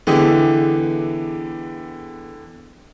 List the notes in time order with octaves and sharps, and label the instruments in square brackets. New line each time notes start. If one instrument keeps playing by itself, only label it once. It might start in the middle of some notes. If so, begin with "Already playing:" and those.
[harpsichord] E2 G#4 D#5 [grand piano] D3 E3 G4